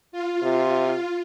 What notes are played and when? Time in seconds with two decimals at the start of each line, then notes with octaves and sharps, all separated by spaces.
0.12 F4
0.43 C3